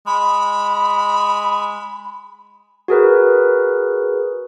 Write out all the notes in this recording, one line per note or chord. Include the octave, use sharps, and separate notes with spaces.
G#3 B5
F#4 G#4 A#4 B4